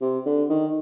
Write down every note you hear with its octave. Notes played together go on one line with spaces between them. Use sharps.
C3
D3
D#3